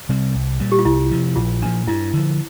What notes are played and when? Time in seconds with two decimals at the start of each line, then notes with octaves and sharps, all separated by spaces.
0.09 C3 G3 C4
0.35 C2
0.60 A#2 G3
0.72 G4
0.79 F4
0.85 C2 E4
1.11 C3 F3
1.36 A#1 F4
1.62 A#2 D4
1.65 F3
1.87 G2 E4
2.14 D3 F3